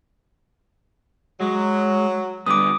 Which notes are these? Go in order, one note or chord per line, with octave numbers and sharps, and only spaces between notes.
F#3 G#3
D3 G3 B3 D6 D#6